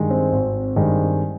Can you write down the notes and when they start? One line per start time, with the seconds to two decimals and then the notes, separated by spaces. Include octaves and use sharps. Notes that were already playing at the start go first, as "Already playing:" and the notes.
Already playing: G2 D#3 G#3
0.10 C4
0.32 G#1
0.76 G2 D#3 G#3 C4